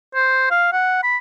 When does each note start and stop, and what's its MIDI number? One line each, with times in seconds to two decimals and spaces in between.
0.15 0.51 72
0.51 0.68 77
0.73 1.03 78
1.03 1.17 83